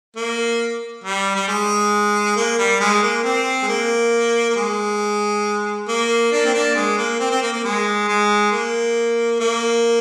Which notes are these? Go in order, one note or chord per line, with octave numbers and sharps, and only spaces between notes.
A#3
G3
G3
G#3
A#3
G3
G#3
A#3
C4
G#3
A#3
A#3
G#3
A#3
A#3 D4
C4
A#3 D4
G#3
A#3
C4
C4
A#3
A#3
G#3
G#3
A#3
A#3